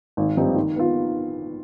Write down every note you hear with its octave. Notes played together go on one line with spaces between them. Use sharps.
G#1
G2 F3 C4 D#4
D#3
B3 F4